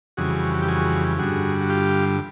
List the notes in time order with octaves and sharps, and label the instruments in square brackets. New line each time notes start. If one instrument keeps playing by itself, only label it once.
[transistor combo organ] F2 C#3 E3 G3 F#4 G#4
F#4
G4
F#4 G#4
G2 D3 G3 F#4 G#4
F#4
F4 G4